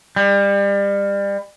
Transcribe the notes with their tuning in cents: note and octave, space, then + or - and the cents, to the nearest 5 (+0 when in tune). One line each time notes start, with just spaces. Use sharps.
G3 +30